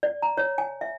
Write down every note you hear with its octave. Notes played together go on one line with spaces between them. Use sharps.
D5
A#5
C#5
G#5
E5